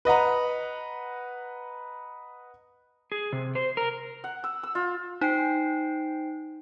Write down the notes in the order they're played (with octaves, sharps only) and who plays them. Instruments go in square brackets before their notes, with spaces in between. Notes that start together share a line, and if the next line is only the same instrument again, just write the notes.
[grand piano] B4 D#5 F#5 A#5
[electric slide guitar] G#4
C3
C5
A#4
[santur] F#5
E6
E6
F4
[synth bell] D#4 [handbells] C5 G5 C7